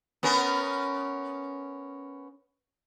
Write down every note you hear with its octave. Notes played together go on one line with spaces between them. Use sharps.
B3 C#4 A#4